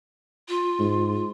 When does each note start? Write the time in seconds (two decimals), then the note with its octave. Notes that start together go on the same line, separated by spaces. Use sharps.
0.49 F4
0.79 G#2